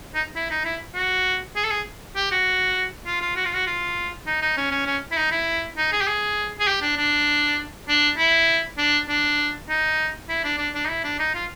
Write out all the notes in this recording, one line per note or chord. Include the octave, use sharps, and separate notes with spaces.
D#4
E4
D#4
E4
F#4
G#4
A4
G#4
G4
F#4
F4
F4
F#4
F4
F#4
F4
D#4
D#4
C#4
C#4
C#4
E4
D#4
E4
D#4
G#4
G4
G#4
G#4
G4
D4
D4
D4
E4
D4
D4
D#4
E4
D4
D4
D4
D#4
E4
D4
D#4
F4